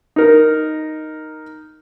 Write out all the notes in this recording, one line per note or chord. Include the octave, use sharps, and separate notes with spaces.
D#4 A#4